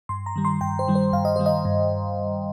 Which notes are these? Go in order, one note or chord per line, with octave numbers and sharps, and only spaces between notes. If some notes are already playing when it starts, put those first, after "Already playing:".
G2 C6
A#5
D#3 G3
C6
G2 G5
C5
D#3 G3
C5
G2 F5
D#5
D#3 G3 C5
D#5
G2